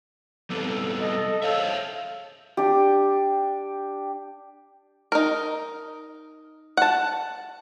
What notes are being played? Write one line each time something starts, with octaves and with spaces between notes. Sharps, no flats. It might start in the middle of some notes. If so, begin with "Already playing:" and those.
G3 B3 C4 A4
D#5
C5 C#5 E5 F5
D4 G4
D#4 A#4
F#5 A5